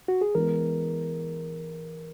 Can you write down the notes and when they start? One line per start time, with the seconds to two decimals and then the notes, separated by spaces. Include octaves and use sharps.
0.08 F#4
0.21 G#4
0.35 E3 G#3 B3 A#4